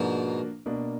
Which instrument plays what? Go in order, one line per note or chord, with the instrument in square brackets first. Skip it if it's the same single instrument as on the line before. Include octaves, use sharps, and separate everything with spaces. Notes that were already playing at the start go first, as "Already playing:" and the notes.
Already playing: [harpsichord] G#2 B2 [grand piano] F3 A#3 D4 F#4
[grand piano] B2 A#3 D4